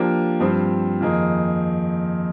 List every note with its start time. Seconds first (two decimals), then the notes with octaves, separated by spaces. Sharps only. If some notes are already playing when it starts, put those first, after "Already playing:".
Already playing: F3 A#3 D4 G4
0.40 G2 F3 C4 G4
1.00 F2 D#3 A#3 D#4 G#4